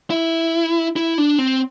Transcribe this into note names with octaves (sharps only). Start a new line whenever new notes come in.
E4
E4
D4
C4